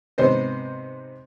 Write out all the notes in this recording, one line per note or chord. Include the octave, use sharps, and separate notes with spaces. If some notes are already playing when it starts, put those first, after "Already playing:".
G#2 C3 B3 C5 D#5